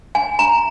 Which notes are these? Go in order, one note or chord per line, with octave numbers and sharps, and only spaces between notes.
G#5
A#5